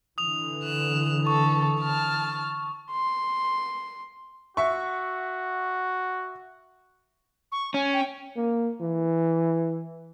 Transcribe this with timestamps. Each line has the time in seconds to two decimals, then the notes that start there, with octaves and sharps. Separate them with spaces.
0.18 D3 E3 D#6 F7
0.64 F#6 E7
1.27 A4 C#6
1.81 A5 F6
2.91 C6
4.57 F#4 E5 C#6
7.52 C#6
7.74 C#4 G#5
7.93 G5
8.37 A#3
8.81 E3